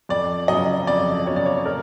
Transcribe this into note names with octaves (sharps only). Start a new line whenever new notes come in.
F2 D5
C#3 F#3 D#5
F2 D5
C#3 F#3 C#5
D5
C#5
A#2 A#4